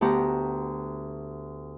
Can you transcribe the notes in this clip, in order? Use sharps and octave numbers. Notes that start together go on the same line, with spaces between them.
D2 B3 G4 A#5